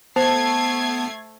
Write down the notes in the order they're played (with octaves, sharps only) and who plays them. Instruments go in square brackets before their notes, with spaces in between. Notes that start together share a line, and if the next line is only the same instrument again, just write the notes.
[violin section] A3 G#6 C7 [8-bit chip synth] B3 [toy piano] C5 [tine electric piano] A5